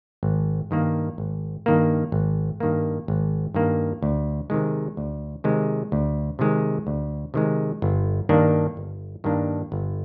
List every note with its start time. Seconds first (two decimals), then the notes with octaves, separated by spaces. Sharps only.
0.23 G#1
0.71 G2 D#3 A#3
1.18 G#1
1.66 G2 D#3 A#3
2.12 G#1
2.60 G2 D#3 A#3
3.08 G#1
3.54 G2 D#3 A#3
4.02 D2
4.50 C3 D#3 G#3
4.97 D2
5.44 C3 D#3 G#3
5.92 D2
6.39 C3 D#3 G#3
6.87 D2
7.34 C3 D#3 G#3
7.82 G1
8.29 G2 D#3 A#3 D4
8.77 G1
9.24 G2 D#3 A#3 D4
9.72 G1